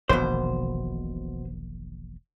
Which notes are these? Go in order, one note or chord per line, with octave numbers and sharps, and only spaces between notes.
E1 A#1 B2 D#3 C5